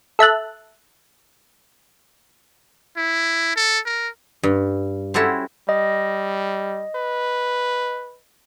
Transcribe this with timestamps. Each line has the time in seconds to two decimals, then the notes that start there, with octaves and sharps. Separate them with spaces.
0.19 A4 E5 A5 F#6
2.97 E4
3.56 A4
3.86 A#4
4.43 G2
5.14 C#4 E4 F#4 G4 A4 C5
5.69 G3 D#5
6.95 B4